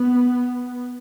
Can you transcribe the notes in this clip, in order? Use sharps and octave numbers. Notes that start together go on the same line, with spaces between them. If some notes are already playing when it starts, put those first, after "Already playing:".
Already playing: B3